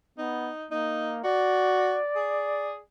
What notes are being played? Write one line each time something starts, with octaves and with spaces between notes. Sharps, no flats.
B3 D#4
A#3 D#4
F#4 D5
G#4